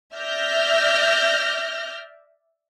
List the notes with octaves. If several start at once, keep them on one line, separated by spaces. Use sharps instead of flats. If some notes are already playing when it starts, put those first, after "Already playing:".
D5 E5 F6 G6 A#6